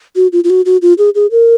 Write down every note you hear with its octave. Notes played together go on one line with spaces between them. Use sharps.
F#4
F4
F4
F#4
F#4
F4
G#4
G#4
A#4